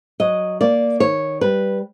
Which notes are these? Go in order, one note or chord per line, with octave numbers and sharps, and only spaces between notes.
F#3 D#5
A#3 D5
D#3 C#5
G3 B4